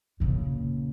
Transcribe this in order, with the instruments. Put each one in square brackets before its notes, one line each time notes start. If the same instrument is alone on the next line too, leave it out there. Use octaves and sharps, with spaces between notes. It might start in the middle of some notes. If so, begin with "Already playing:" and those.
[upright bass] A#2 C#3